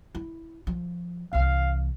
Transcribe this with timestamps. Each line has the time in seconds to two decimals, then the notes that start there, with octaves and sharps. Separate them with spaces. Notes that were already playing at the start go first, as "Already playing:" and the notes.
0.15 E4
0.67 F3
1.33 C2 E3 F5